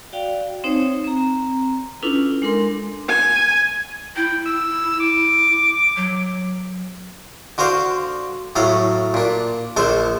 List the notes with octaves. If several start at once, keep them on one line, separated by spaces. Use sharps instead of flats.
F#4 D5 F5 G5
C4 D#4 C5 C#5
C4 A#5
C#4 D4 E4 F4 A4 B4
G#3 D4 A4 A#4 C6
G#5
E4 G5
E6
D6
F#3
D3 F#4 C5 F5 D6
A2 F#3 A4 F5
A#2 D4
A#1 D3 A4 C5 A5